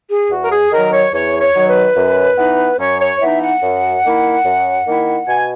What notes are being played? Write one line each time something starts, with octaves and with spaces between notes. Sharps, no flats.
G#4
E2 F#4
A#4
G#4
D#3 F#3 A#4
C#5
E2 C#5
C#5
D#3 F#3
B4
F#2
E3 B3 D#4
F#2 C#5
C#5
E3 B3 D#4 E5
F#5
F#2
D#3 A#3 E4
F#2
D#3 A#3 E4
B2 G#5